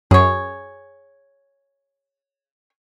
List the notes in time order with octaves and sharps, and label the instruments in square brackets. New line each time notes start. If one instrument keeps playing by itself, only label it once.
[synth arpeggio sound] F#2 [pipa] G#4 C#5